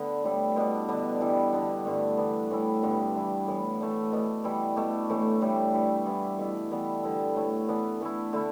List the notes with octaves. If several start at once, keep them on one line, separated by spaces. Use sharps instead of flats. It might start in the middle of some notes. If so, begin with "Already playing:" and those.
Already playing: D3 B3
A2 G3 E4
B2 B3 D4
D3 B3 D4
E3 G3 E4
D3 B3 D4
G2 D3 A3
E3 B3 D4
A2 E3 G3 E4
G2 D3 G3 B3
E3 G3 E4
A2 E3 B3
E3 A3 D4
B2 B3 D4
E3 G3 E4
B2 A3 D4
A2 E3 A3
A2 G3 E4
G2 G3 E4
E3 G3 B3 E4
B2 A3 E4
E3 G3 B3 D4
D3 G3 B3 E4
A2 A3 E4
E3 B3 D4
E3 A3 E4
D3 A3 E4